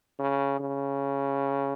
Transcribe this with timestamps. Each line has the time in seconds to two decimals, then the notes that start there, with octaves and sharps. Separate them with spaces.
0.19 C#3
0.60 C#3